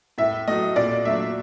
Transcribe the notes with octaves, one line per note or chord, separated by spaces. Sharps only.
A2 E5
F#3 A3 D#5
A#2 D5
F#3 A3 D4 E5